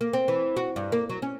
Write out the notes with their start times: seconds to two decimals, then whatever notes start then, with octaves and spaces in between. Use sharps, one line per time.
0.01 A#3
0.13 C4
0.28 E3
0.57 F#4
0.76 G2
0.92 A#3
1.10 F#3
1.22 C#4